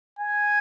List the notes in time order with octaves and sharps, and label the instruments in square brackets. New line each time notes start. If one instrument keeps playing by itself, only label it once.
[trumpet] G#5